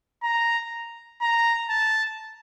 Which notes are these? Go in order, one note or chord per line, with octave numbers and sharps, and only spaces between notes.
A#5
A#5
A5